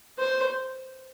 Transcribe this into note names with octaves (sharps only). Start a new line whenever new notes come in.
C5